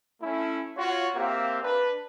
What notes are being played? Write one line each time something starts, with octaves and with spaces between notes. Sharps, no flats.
A3 C#4 E4
F4 F#4 C#5
A#3 C4 G4 E5 F5 G5
D4 B4